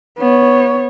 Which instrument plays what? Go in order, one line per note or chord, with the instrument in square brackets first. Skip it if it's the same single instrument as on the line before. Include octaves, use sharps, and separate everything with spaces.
[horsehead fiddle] B3 C#5